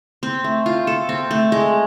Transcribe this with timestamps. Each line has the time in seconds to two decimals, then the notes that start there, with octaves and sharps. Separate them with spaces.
0.23 C4
0.44 A3
0.66 F4
0.87 A4
1.09 C4
1.31 A3
1.52 G#3